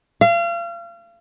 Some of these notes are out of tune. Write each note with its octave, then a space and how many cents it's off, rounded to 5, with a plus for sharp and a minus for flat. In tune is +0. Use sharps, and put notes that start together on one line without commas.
F5 -35